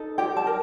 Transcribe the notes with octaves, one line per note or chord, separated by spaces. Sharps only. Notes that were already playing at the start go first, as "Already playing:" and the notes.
Already playing: D#4 A4
G4 G5
A5
A#4